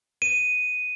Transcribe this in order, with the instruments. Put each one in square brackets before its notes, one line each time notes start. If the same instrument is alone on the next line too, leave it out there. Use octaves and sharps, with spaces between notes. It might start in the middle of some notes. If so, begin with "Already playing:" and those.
[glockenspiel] D#7